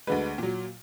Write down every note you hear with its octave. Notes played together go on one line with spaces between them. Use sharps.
D2 D3 G#3 B4
A#2 F#3